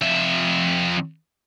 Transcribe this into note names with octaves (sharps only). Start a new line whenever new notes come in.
F2 E5